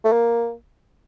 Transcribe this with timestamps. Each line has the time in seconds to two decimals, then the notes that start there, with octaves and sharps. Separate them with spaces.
0.04 A3
0.12 A#3